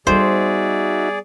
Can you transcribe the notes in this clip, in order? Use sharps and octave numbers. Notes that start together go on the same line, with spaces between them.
G3 B3 D#4 F#4 G#4 C5 D5 E5